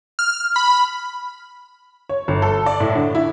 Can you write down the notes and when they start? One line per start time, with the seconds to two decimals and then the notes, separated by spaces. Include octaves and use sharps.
0.19 F6
0.56 B5
2.09 C#5
2.28 G1
2.42 A4
2.66 D5
2.80 A2
2.95 D3
3.15 E4